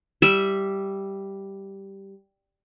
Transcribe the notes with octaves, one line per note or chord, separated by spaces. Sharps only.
G3 E5